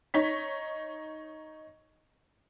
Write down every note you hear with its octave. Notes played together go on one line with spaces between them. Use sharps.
D#4 C#5 B6